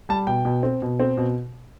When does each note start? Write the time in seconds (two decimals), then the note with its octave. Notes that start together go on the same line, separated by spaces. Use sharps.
0.09 G3 A5
0.27 B2 G5
0.45 B2
0.63 C4
0.82 B2
1.00 C4
1.17 B2